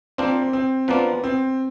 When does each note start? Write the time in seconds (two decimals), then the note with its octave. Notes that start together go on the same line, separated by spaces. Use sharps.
0.18 F3 A#3 C4 D4 F4
0.53 C4
0.88 F3 A#3 B3 D4 F4
1.24 C4